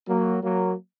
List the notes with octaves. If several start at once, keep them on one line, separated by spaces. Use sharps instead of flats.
F#3 A#3
F#3 A#3